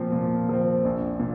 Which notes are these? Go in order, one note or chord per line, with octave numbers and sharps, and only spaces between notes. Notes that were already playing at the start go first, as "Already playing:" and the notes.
Already playing: A#2 F3 C4
A#2
F3 C4
A#1
A#2